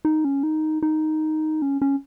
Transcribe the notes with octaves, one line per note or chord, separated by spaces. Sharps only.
D#4
C#4
D#4
D#4
C#4
C#4